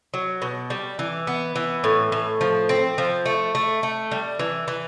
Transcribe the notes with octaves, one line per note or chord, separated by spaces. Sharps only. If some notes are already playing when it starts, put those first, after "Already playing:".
F#3
B2
G3
E3
B3
E3
A2
A2
F3
C4
F3
A3
A3
A3
G3
E3
E3